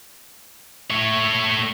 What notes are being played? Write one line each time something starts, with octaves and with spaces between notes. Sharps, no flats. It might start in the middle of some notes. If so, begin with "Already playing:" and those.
A3 C#5